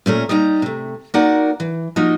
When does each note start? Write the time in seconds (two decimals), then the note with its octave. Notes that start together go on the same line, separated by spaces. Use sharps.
0.06 A#2 A3 C#4 A#4
0.29 G3 A#3 D#4 A#5
0.62 C3 A3
1.14 A#3 D#4 F#4 A#4 D5 F#5
1.60 E3
1.96 F3 A#3 D#4 F#4